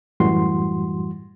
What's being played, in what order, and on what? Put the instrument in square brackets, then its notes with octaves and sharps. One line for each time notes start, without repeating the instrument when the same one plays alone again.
[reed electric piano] F#2 A2 E3 G3 F#4 C6